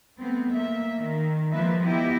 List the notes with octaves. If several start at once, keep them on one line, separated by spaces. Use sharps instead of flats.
A3 B3 C4
A#3 E5
D#3
F3 G#3 A#3 B4 E5
B3 E4 G4 D#5